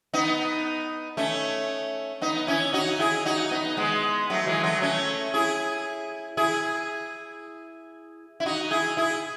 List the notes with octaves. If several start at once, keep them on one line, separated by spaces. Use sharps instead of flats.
B3 D#4
A3 C#4
B3 D#4
C#4 E4
D#4 F#4
E4 G#4
D#4 F#4
B3 D#4
G#3 B3
F#3 A3
E3 G#3
F#3 A3
A3 C#4
E4 G#4
E4 G#4
E4
D#4 F#4
E4 G#4
E4 G#4